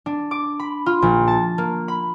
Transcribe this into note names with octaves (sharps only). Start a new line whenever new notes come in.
D4
D6
B5
F4
A#1
A5
A#3
B5